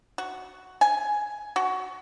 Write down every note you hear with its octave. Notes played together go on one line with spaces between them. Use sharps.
F#4
G#5
F#4